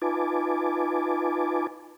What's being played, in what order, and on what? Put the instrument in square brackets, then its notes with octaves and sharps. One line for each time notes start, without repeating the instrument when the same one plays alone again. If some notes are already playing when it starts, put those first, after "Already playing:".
[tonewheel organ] D#4 F4 B4 G#5 A5 D6